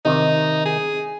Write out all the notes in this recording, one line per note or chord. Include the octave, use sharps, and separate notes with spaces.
C3 D#3 D#4
G#4